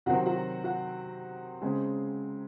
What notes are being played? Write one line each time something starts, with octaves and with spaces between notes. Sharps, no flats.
C3 D#3 F#3 C4 F#4 F#5
F#4 F#5
F#4 F#5
C#3 G#3 C4